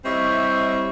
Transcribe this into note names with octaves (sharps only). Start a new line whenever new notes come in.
G3 C4 E4 C#5 D#5 E5